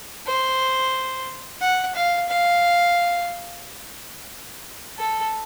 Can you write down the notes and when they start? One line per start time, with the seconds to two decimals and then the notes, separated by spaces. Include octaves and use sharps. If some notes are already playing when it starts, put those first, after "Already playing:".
0.27 C5
1.61 F#5
1.95 F5
2.28 F5
4.99 A4